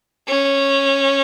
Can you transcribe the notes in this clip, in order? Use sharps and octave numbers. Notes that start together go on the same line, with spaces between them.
C#4